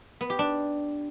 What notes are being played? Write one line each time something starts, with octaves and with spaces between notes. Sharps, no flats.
B3
G4
D4